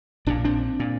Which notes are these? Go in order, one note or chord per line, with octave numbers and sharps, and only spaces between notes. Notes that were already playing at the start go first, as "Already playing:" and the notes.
A#1 A#2 D4
C4 D4
A#2